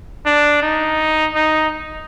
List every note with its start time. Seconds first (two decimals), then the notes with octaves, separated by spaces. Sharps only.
0.26 D4
0.63 D#4
1.35 D#4